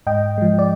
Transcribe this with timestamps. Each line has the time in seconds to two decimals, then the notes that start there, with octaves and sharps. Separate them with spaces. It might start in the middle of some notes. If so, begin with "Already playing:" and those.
0.07 G#2 D#5 G5
0.38 F3 G#3
0.59 D5